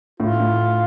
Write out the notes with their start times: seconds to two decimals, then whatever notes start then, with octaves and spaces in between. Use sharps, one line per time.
0.20 A2 F4
0.40 A2